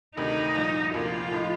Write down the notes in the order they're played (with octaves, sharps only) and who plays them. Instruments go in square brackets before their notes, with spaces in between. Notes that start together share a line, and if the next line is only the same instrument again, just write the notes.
[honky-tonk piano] D2 C3 D#3 A3 [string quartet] D#4
[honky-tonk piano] C2 A#2 F3
[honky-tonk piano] D2 C3 F3 A#3 [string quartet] F4
[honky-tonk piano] A2 F3 A3 D#4